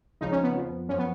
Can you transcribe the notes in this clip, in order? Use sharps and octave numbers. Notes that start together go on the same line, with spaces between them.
C#2 C#3 F3 D#4
C#4
B3
F2 F3
F#2 F3 C#4
B3